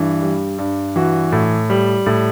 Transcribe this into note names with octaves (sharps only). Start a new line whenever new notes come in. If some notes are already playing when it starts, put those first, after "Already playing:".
Already playing: G2 E3
G3
G2
E3 F#4
A2
G3
A2